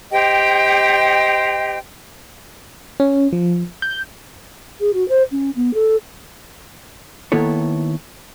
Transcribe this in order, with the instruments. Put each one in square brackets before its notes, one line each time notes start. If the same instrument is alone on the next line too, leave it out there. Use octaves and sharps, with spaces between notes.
[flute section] G4 C5 D#5 G5
[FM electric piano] C#4
F3
G6
[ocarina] G#4
F#4
C5
C#4
B3
A4
[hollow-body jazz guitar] D#3 A#3 B3 E4 A4 C#5